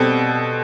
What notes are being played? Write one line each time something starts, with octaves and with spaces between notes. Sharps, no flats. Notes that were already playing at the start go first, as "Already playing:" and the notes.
Already playing: B2 G3 C4 A4